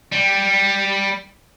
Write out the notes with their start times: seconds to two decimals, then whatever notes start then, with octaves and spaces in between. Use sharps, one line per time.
0.12 G3